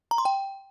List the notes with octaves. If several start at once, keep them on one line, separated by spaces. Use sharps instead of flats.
A#5
C6
G5